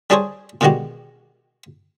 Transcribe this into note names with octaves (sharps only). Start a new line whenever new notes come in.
G3 D4 G#4 A4 C5 C#5
B2 D3 D#3 G#3 F#4 G4